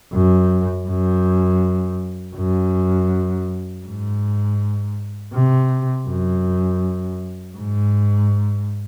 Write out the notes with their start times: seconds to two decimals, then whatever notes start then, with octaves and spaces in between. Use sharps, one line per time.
0.13 F#2
0.88 F#2
2.36 F#2
3.85 G#2
5.34 C3
6.08 F#2
7.57 G#2